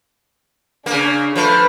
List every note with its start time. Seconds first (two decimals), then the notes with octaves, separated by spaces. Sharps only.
0.86 C#3 A#3 D4
1.35 F3 A3 B4